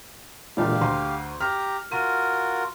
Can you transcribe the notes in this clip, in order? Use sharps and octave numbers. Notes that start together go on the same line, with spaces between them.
E1 A#2 D3 G4 F5
D2 A#5 C6
G4 A#5 F6
F4 F#4 A#4 D#7